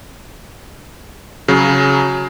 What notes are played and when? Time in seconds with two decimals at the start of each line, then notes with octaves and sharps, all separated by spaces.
1.48 C#3 F#3